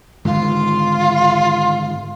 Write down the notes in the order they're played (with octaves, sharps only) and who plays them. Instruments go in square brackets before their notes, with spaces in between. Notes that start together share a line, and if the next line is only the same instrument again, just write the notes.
[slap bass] G#2 D3 D#3 [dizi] F4